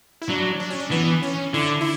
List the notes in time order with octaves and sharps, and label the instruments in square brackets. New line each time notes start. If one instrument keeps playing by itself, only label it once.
[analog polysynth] E4
[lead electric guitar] F#3 [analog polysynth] D4
[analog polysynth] D4
C#4
D4
[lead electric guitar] E3 [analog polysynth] B3
[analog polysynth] C#4
[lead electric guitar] D3 [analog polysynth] E4
[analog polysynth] E4